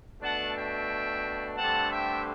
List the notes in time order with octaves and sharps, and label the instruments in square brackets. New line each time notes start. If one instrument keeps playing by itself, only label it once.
[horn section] B2 A3 D4 F#5 A5
E5 G5
G2 D3 A3 C4 F#5 A5
E5 G5